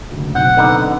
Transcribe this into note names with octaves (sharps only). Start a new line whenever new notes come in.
F#1 D2
B1 C4 F#5 G6
D3 B3 D#4